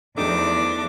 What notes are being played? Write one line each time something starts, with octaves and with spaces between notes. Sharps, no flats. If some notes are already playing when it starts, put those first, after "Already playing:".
E2 F3 A3 D4 D#4 G4 D6